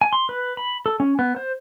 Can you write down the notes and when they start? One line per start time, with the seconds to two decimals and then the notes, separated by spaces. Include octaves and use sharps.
0.01 G#5
0.13 C6
0.29 B4
0.57 B5
0.86 A4
1.00 C#4
1.19 B3
1.36 C5